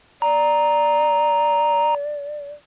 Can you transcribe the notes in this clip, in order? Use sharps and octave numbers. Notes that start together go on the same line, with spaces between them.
D5 A#5